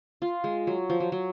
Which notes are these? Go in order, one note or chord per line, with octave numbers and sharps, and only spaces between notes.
F4
G#3
F#3
F3
F#3
F#3